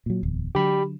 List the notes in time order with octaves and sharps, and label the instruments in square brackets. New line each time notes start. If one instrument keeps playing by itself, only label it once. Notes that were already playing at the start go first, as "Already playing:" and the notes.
[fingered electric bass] A#2 F#3
D1 E2
[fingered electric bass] D3 F#3 [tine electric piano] G4 B5